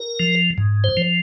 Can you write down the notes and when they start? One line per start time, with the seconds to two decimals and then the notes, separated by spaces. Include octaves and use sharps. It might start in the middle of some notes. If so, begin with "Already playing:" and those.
Already playing: A#4
0.20 F3
0.58 G#2
0.84 C5
0.97 F3